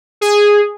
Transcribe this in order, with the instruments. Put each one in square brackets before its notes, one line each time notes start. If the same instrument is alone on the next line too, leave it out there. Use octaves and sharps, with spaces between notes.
[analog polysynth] G#4